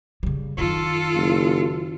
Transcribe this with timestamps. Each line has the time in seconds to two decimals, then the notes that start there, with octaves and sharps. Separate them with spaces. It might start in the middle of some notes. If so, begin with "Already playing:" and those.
0.23 C#3 G3
0.57 F#2 D#3 F4 A4
1.15 F#1